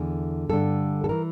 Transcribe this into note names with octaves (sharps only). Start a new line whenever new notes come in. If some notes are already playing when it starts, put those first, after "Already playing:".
Already playing: E2 D3
G2 D3 A4
A4
E3 A#4